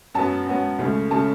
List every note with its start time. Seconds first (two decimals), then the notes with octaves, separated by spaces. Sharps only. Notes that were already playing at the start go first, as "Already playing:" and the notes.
0.14 F#2 F#3 B3 A5
0.46 F#2 F#3 B3
0.79 C#2 C#3 A3
1.11 C#3 A3 A5